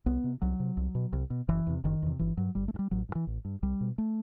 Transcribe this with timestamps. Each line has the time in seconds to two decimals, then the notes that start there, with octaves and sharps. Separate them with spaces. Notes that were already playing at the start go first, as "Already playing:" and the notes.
0.06 C2 B3
0.24 C3
0.42 C2 F#3
0.60 C3
0.77 C2
0.95 B2
1.13 C2
1.30 B2
1.48 F#1 E3
1.67 E2 C3
1.84 F#1 D#3
2.02 E2 C3
2.19 G1 E3
2.37 G2 F#3
2.55 G1 G3
2.68 A3
2.74 G2
2.79 G3
2.91 A1 F#3
3.09 G2
3.15 E3
3.27 A1
3.45 G2
3.62 C2 G3
3.81 B2
3.98 A3